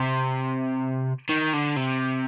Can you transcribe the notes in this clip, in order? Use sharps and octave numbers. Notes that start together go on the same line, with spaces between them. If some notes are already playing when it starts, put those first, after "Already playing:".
Already playing: C3
D#3
D3
C3